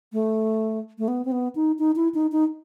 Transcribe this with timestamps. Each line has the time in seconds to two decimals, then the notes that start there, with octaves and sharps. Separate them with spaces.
0.13 A3
0.99 A3
1.08 B3
1.25 C4
1.32 B3
1.55 D#4
1.79 D#4
1.96 E4
2.14 D#4
2.32 D#4